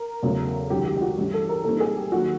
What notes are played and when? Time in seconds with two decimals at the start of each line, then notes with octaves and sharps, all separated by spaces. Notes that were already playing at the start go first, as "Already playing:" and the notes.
Already playing: A#4
0.23 E2 C#3 F#3 A3
0.70 C#2 C3 D#3 F#3 G4
0.86 G4
0.96 G4
1.01 F#4
1.17 G2 E3 A3 C#4 G4
1.34 A4
1.49 A#4
1.64 A#2 G3 C4 D#4 A4
1.80 G#4
1.97 G4
2.12 D#2 D#3 F#3 F#4